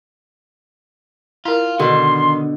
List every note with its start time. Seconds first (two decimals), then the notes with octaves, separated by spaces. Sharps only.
1.45 E4 F4 A#4
1.79 B2 D3 D#3 C6